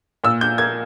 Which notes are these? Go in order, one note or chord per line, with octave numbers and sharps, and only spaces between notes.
A#2 E6
G6
A#3 G#6